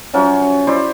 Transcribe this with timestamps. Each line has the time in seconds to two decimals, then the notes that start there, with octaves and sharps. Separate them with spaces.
0.13 F3 F#3 C#4 E5
0.67 E4 C5 D5